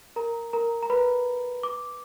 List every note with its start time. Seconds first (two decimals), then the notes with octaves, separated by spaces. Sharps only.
0.16 A#4 A#5
0.53 A#4 A#5
0.83 A#5
0.90 B4 B5
1.63 D6